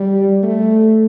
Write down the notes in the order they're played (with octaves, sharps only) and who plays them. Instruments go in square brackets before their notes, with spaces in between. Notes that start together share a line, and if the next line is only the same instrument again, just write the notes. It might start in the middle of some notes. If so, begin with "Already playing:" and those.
Already playing: [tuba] G3
A3